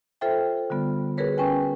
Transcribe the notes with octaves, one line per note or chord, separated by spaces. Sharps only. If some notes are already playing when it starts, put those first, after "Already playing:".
F4 A4 C5 E5 G5
D3 G3 B3 F4
F#4 G#4 A#4 B4 C#5
C#4 B4 G5 G#5